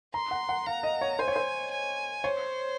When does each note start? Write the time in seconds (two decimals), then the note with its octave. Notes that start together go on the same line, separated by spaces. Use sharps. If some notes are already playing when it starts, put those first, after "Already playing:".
0.14 A#5 C6
0.31 F#5
0.49 F#5
0.66 F5 A#5
0.83 D#5
1.01 C#5
1.19 C5 G#5
1.28 C#5
1.36 C5
1.71 G#5
2.23 C5 C#5